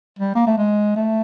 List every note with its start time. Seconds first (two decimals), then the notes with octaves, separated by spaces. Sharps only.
0.19 G3
0.36 A#3
0.47 A3
0.58 G#3
0.96 A3